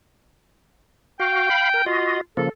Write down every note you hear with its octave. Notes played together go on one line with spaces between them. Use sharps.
F#4 F5 G5
F5 B5
A#4
F4 F#4 D#5
C#3 F3 A#3 A4